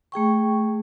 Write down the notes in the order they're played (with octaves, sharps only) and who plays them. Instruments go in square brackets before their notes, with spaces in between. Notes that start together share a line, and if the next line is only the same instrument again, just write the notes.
[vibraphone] A3 G#4 G5 C#6